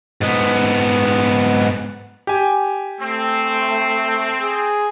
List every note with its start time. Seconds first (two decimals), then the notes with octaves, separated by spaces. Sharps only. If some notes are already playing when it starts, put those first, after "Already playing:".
0.21 G#2 B3
2.27 G4 G#5
3.01 A3 C4
4.41 G#4